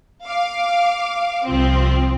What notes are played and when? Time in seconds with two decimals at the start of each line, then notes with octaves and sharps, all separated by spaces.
0.25 F5 D6
1.46 C2 F3 C4